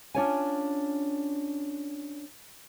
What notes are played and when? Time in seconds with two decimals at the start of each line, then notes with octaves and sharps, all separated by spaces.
0.15 C#4 D4 F4 C#5 G5 G#5